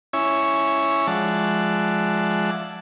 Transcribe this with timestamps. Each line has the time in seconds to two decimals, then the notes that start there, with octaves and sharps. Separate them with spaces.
0.13 C#4 E4 C#5 E5 G#5
1.07 F3 G#3 D5 E5 F#5 A5